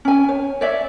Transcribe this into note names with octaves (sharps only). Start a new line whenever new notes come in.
C#4 G#5
C#5
C#5 D5 E5